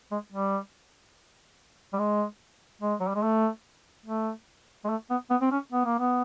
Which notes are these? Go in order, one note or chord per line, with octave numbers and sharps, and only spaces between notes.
G#3
G3
G3
G#3
G#3
F#3
G3
G#3
A3
A3
G#3
A3
B3
B3
C4
C#4
B3
A#3
B3